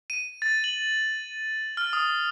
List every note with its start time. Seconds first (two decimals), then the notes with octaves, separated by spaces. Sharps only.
0.10 D#7
0.42 A6
0.64 F#7
1.77 F6
1.93 D#6